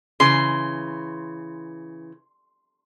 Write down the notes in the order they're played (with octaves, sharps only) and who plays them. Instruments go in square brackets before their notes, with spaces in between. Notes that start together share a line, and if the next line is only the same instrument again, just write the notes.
[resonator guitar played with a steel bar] C#3 E3 [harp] C6